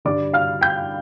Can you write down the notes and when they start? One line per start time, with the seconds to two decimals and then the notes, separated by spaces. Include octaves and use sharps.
0.05 G2 D3 G3 D5 D6
0.34 F5 F6
0.61 G5 G6